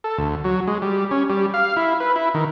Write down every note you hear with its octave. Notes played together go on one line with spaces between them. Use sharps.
A4
D2
F#3
G#3
G3
C#4
G3
F5
E4
B4
E4
D#3